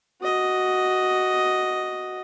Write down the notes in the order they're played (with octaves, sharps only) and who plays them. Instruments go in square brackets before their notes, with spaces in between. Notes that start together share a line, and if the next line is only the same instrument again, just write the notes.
[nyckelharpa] F#4 D#5